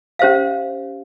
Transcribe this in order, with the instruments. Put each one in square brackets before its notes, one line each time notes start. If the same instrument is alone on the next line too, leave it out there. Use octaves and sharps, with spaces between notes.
[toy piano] C#4 G4 C5 E5 F5